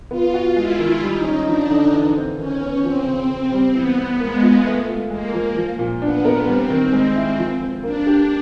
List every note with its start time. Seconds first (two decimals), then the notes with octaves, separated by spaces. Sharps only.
0.11 B3 F4
0.34 F#4
0.56 G#3 E4
0.79 D#3
1.01 G3 D#4
1.24 C#4
1.47 F3 D4
1.70 D3
1.93 E3
2.16 C4
2.38 D#3 C#4
2.60 B3
2.84 F3 C4
3.06 C#3
3.29 C4
3.52 G3
3.74 E3 B3
3.98 C4
4.20 G#3 A#3
4.43 F4
4.66 A3
4.88 F4
5.11 G#3 A#3
5.34 F3
5.56 F3
5.79 A#2
6.02 B3 D4
6.25 A#4
6.47 G3 C4
6.70 D#3
6.93 G#3
7.15 E4
7.38 F3
7.61 C4
7.83 A#3 D4
8.07 G4